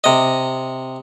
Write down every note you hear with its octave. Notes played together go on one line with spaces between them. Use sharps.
C3 D#5